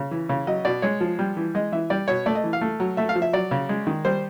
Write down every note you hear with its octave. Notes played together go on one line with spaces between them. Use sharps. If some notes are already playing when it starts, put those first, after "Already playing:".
Already playing: C#3
E3
C#3
F#3 D#5
B2 D5
G#3 C#5
F3
G3
E3
G#3 D#5
E3 E5
G3 D5
B2 C#5
A3 D5
D#5
E3
F5
A3
F#3
A3 E5
F5
F3
E5
F#3 D5
C#3
G#3
D#3
G3 C5